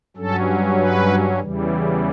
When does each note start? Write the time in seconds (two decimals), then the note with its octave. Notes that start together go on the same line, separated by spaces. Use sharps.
0.17 G2 F#3 C#4 A4
0.78 B4
1.40 E2 C#3 E3 G3